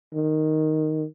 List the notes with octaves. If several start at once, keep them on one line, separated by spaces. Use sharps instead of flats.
D#3